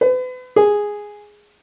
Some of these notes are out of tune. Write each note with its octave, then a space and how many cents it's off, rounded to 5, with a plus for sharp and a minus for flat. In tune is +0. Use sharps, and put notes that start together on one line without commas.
B4 +40
G#4 -5